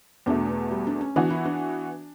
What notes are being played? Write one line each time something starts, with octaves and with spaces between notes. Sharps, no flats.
E2 B2 A3 D4
B3
G3
D4
C#4
E3 B3 D4 F#4
E4
D4